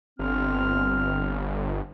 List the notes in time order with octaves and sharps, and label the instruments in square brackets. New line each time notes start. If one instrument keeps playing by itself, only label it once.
[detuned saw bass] G1 [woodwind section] C4 F6